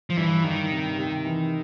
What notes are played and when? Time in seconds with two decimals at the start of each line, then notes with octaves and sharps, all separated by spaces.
0.10 F3
0.17 G2 E3
0.44 G2 D#3
0.71 C3
0.98 C3
1.25 E3